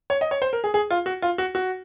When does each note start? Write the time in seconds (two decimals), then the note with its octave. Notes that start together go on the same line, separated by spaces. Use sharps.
0.10 C#5
0.21 D#5
0.31 C#5
0.42 C5
0.53 A#4
0.64 G#4
0.74 G#4
0.91 F4
1.06 F#4
1.22 F4
1.38 F#4
1.55 F#4